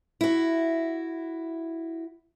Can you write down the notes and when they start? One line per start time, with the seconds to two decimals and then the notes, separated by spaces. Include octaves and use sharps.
0.21 E4 F#4